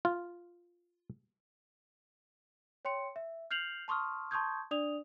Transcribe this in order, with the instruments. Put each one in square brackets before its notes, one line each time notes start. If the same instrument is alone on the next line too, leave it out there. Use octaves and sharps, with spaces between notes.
[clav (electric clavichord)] F4
[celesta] C#5 G5 C6 C#7
E5
F6 G6 C7 F7 F#7
A5 C6 C#6 D#6 F6
A5 C6 C#6 D#6 G6 G#6
D4 D5 D#6 F7